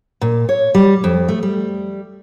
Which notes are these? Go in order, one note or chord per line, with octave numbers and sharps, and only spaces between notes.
A#2
C#5
G3
F2
A3
G3